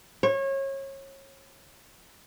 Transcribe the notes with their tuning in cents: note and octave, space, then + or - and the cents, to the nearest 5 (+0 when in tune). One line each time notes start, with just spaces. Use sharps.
C#5 -30